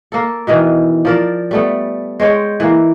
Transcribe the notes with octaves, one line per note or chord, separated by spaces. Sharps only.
A#3 A4
B2 D#3 E3
F3 A#4 D5
G3 A3 B3
G#3 C5 C#5 G5
E3 A#3